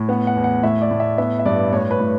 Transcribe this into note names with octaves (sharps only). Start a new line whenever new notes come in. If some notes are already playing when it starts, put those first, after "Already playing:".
Already playing: A2
B3 F#5
F#5
E2
F#5
A2 E5
D5
A2
E5
B3 E5
E5
G2 D5
A2 C#5
B4
A2